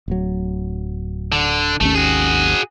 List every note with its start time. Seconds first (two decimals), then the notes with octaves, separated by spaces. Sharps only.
0.08 D1 F#3
1.32 D3
1.81 G#1 D#2 A3 C#4
1.95 F#4 G#4